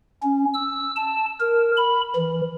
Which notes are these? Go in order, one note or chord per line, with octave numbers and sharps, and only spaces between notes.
C#4
E6
A5
A#4
B5
E3